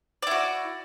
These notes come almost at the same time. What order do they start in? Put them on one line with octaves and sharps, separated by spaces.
D5 E4 F#4